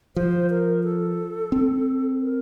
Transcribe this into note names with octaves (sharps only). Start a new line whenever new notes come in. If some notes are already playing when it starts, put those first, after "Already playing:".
F3 C5
A#4
A4
C4
A#4